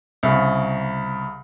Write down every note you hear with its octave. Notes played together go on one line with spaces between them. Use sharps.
C2 C#3